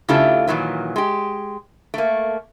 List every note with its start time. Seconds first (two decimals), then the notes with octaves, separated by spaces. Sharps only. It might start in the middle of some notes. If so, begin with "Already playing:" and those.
0.09 C#3 A3 E4 F4 G4 A4
0.47 A#2 D#3 E3 F#3
0.96 G#3 G4
1.94 A3 A#3